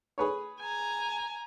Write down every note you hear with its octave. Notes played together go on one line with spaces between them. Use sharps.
G#4 B4 C#5
G#5 A#5